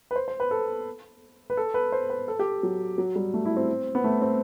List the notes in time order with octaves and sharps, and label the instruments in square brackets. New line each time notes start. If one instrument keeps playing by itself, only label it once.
[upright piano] B4
C5
C5
B4
A4
B4
A4
B4
C5
B4
A4
G4
F#3
F#3
G3
A3
E4
C4
B3
A3
C4